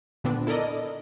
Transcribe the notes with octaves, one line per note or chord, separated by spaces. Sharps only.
A#2 D3 B3 C4 D4
E4 A4 A#4 D5 D#5